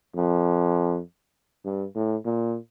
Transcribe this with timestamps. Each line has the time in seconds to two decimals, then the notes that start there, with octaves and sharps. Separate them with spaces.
0.15 F2
1.65 G2
1.95 A2
2.25 A#2